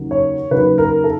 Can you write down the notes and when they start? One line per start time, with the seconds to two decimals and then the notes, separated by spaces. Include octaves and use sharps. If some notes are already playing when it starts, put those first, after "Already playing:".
Already playing: D#2 C#3 F#3
0.11 C#5
0.51 D#2 C#3 F#3 B4
0.78 A#4
1.04 A4